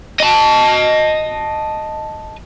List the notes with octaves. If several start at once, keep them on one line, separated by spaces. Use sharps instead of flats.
D#5 A5